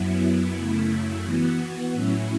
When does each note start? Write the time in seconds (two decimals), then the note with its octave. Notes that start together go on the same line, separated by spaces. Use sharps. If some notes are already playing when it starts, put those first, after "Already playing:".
Already playing: F#2 F#3 B3 E4
0.55 F#2 C#3 A3 E4
1.23 E3 B3 F#4
1.93 A2 F#3 C#4 E4